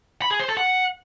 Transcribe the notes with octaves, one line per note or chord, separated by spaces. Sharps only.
B5
G#4
C5
A4
F#5